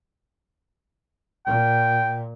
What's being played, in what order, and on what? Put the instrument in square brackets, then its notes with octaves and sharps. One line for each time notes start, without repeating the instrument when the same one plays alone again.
[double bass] A#2 [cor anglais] G5